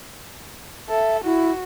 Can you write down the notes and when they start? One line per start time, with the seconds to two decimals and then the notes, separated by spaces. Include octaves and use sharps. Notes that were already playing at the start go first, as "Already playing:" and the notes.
0.89 A4 E5
1.24 E4 F#4